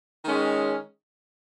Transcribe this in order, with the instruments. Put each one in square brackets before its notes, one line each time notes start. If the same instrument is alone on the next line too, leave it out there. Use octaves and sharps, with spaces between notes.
[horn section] D#3 G#3 C#4